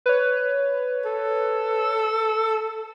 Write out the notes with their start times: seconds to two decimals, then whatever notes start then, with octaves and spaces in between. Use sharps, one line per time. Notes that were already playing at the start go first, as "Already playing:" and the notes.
0.06 B4 C#5
1.05 A4